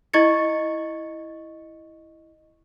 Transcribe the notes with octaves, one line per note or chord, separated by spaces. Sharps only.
E4 D#5 C#6 G#6 A6 C#7